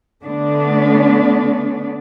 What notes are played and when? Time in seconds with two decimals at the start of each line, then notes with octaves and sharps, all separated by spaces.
0.24 D3 A3 B3 D4